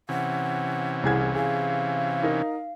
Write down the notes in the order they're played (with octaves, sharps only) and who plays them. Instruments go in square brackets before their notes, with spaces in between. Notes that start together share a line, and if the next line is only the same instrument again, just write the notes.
[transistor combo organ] C3 E3 C#4 [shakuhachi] F#5
[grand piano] C2 G#4 G#6
[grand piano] G#4 [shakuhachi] F5
[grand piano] D#4 A#4